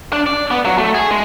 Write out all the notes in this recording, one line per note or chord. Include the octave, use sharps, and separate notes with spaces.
D4
D5
B3
F#3
A3
G#4
G#3